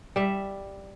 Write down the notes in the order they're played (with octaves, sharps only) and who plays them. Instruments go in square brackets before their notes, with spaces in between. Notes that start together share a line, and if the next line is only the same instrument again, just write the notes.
[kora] G3 E5